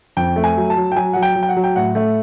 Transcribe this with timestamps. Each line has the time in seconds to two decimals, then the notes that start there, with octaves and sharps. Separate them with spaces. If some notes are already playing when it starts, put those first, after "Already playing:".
0.17 F2 G5
0.36 A3
0.44 G#5
0.57 F#3
0.70 A5
0.77 F#3
0.92 G5
0.96 F#3 G#5
1.13 F#3 F#5
1.23 G5
1.36 F#3
1.43 G5
1.49 F#5
1.56 F#3
1.64 G5
1.76 A2 F#5
1.95 A3